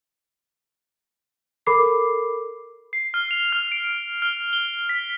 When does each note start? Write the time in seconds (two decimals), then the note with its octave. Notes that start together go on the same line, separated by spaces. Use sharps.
1.67 A4 A#4 B5 D6 C7
2.93 C7
3.14 F6
3.31 F7
3.52 F6
3.72 D7
4.22 F6
4.53 G7
4.89 B6